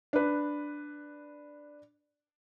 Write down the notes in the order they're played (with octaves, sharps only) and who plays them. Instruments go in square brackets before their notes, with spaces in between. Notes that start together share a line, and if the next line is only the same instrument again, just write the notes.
[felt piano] D4 B4